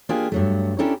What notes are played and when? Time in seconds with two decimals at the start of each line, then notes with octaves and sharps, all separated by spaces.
0.09 A#3 D4 F4 G4 G#4
0.32 G2 F#3 A3
0.78 C#4 D4 E4 G4 A4 A#4